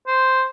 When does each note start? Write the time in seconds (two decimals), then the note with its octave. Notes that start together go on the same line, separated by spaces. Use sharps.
0.07 C5